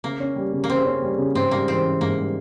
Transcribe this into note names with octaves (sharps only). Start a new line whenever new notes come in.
C#3 A#3
C#4
G3
C#3
A#3
C#3 C4
C#4
G3
C#3
G#2 C4
G3 A#3
E3 C4
C#4
G#2 A#3
G3